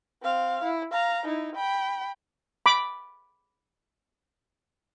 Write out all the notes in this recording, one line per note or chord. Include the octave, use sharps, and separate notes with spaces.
C4 F5
E4
F5 A#5
D#4 E4
G5 B5
B5 D6